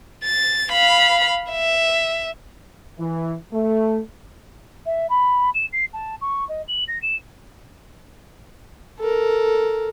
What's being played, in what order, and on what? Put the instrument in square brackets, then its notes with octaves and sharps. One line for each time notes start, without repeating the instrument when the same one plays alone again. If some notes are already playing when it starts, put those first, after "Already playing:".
[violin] A6
F5 B5
E5
[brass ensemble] E3
A3
[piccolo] E5
B5
E7
C7
A5
C#6
D#5
F#7
A#6
E7
[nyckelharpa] A4 A#4